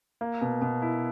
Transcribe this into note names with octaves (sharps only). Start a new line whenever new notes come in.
A#3
B2
B2
E4